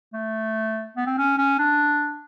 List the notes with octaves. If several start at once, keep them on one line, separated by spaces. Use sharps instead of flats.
A3
B3
C4
C#4
C#4
D4